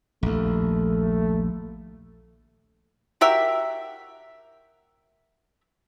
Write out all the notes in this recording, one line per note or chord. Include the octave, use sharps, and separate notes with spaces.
A#1 D#2 A3
F#4 G4 A#4 E5